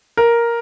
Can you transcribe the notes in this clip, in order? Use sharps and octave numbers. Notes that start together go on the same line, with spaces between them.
A#4